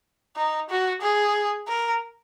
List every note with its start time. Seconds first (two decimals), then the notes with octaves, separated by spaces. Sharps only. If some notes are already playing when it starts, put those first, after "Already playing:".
0.37 D#4
0.70 F#4
1.02 G#4
1.68 A#4